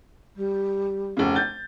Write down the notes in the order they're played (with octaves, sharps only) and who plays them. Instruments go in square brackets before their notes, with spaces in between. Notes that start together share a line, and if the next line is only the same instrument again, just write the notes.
[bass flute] G3
[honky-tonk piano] F1 C#3
G6 A6